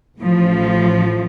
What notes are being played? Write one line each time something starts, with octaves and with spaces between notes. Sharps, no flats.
A1 A2 F3